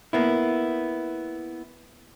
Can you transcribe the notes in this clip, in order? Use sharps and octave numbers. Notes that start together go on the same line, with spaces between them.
A#3 B3 E4